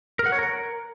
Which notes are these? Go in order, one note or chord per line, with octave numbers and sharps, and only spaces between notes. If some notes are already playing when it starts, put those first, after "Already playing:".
A#4
F#5
C#5
A#4